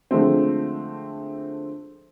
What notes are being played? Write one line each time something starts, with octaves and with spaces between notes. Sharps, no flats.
D3 F3 G#3 A3 C4